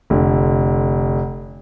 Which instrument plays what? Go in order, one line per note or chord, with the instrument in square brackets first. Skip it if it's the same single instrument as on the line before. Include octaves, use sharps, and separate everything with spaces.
[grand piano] F1 D3